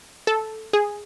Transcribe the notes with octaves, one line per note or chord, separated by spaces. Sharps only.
A4
G#4